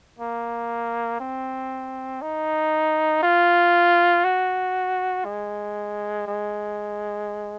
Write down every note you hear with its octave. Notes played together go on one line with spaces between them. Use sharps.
A#3
C4
D#4
F4
F#4
G#3
G#3